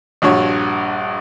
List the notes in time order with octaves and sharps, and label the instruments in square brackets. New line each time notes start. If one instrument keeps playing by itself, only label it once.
[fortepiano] A#1 G2 F#4 C#5